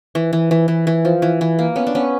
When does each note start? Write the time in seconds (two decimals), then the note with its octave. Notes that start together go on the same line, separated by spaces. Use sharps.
0.15 E3
0.33 E3
0.51 E3
0.68 E3
0.87 E3
1.05 F3
1.22 E3
1.41 E3
1.59 A#3
1.76 B3 C#4
1.87 D4
1.95 B3 C#4